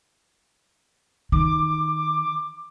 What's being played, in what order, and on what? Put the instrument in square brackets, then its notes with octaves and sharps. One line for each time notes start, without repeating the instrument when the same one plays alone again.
[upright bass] D#3 [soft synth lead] D6